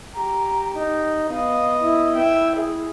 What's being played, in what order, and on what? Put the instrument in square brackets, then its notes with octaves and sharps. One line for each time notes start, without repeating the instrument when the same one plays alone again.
[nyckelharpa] G4 [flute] A#5
[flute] D#4
[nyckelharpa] B3 D#5 [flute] F5
[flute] E4
[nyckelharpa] E5 G5
G#4